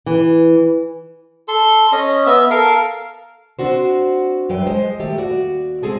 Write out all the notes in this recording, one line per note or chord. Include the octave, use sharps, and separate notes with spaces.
E3
A4 C6
C#4 D#5
B3 E5
A4 A#4 F5
C4 D4 F#4 C5
F#2 F#3 B4 G5
G#3 C5 D#5
D#3 A3 G4
D#2 F#4 D5
G#3 C4 G#4 A4